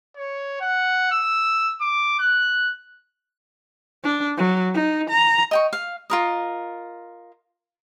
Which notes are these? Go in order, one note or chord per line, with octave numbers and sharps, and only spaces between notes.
C#5
F#5
E6
D6
F#6
D4
F#3
D#4
A#5
D#5 G5 C#6
F5
F4 A#4 D#5